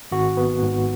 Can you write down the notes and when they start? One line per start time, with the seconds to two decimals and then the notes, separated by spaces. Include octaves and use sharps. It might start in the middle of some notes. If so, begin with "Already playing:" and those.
0.12 G#1 F#4
0.37 B3
0.62 G#2